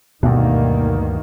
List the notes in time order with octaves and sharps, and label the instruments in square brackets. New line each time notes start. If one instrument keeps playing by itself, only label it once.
[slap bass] D2 G2 [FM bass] B2 [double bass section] D#3 A#3